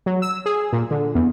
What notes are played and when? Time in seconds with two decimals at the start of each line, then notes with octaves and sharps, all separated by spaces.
0.06 F#3
0.22 E6
0.46 G#4
0.73 A#2
0.91 D3
1.15 E2